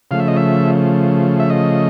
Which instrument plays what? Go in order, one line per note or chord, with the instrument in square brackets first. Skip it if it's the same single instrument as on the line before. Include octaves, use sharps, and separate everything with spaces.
[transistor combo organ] C#3 F3 A3 F5
E5
D#5
E5
E5
D#5